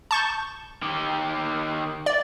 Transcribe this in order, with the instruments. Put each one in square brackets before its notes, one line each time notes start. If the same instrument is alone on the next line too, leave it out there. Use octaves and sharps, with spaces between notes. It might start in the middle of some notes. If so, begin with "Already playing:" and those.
[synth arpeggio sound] A5 C#6 G6
[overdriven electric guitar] D#3 G4
[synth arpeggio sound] D5